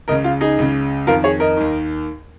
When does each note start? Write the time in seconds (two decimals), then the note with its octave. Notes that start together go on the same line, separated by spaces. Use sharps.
0.08 C#2 C#3 A#4 D#5
0.24 F4
0.41 D#4 G#4
0.58 C#2 C#3
1.07 F2 D#3 F4 A#4
1.24 G#4 C#5
1.40 A#4 D#5
1.56 D#2 D#3